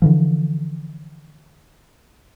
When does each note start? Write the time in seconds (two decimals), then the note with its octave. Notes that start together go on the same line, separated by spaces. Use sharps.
0.02 D3 E3 F3